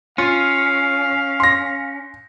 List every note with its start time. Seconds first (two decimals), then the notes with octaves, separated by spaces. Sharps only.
0.18 C#4 F4 F5
1.40 C6 A#6